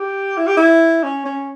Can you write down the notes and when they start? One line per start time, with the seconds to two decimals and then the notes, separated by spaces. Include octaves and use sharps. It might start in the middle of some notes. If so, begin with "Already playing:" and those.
Already playing: G4
0.37 E4
0.47 G4
0.57 E4
1.03 C#4
1.25 C#4